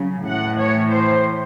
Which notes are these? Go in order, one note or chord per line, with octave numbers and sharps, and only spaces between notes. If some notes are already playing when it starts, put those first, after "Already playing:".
Already playing: C#3 F#3
A2 E3 F#5
C#5
C5